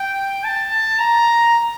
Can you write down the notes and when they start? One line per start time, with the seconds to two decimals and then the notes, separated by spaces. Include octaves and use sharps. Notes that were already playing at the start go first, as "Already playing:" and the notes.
Already playing: G5
0.44 A5
0.99 A#5